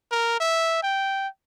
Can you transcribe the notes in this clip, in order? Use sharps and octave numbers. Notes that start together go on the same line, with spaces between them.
A#4
E5
G5